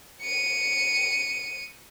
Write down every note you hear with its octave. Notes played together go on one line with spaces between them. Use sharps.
C#7 D#7